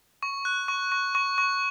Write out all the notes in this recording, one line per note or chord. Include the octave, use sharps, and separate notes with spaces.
C#6
F#6
C#6
C#6
C#6
C#6